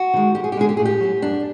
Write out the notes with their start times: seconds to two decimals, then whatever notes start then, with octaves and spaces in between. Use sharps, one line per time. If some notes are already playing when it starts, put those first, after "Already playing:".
Already playing: F#4
0.14 D#3 G#3
0.35 F2 G4
0.44 G#4
0.52 G4
0.57 D3 F3 G#3 G#4
0.69 G4
0.77 A2 G#4
0.85 G4
1.01 F#3
1.22 F#2 D4